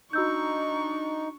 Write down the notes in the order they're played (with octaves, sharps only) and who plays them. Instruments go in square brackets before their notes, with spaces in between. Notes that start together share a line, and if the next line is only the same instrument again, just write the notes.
[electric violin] D4 C#6 [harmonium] D#4 [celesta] F#4 E6 G6